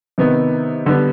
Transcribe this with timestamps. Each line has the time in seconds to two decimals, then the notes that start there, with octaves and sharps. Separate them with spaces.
0.18 C3 D#3 B3
0.86 D3 G3 B3